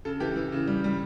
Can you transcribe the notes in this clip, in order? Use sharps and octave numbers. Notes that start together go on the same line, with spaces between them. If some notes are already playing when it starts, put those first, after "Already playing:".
C#3 A4
E3 G4
E3
C#3
G3
G3